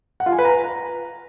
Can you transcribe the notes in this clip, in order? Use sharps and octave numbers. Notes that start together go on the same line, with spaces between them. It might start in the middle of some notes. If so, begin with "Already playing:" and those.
F#5
F4
G#5
B4
A#5